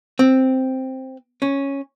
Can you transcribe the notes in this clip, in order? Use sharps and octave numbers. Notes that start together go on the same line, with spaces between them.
C4
C#4